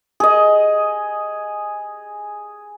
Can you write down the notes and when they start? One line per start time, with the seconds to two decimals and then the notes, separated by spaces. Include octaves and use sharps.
0.20 G#4 D#5